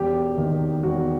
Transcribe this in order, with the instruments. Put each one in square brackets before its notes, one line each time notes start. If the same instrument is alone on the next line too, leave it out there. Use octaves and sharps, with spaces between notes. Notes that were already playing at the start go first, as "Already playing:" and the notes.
Already playing: [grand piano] E1 G4
D#2 D#3
E1 F#4